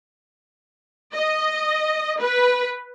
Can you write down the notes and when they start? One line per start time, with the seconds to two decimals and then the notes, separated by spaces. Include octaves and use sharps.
1.13 D#5
2.21 B4